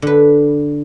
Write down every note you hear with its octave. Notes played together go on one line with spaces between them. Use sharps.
D3 B4